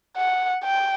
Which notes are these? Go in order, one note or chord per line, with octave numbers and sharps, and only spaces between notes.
F#5
G5